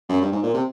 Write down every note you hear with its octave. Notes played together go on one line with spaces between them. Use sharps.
F#2
G2
G#2
A#2
C3